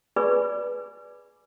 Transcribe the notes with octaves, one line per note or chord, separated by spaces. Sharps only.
G#4 B4 D5 G#5 B5 C#6